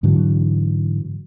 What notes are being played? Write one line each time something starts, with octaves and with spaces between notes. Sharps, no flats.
G#2 D3 E3 F#3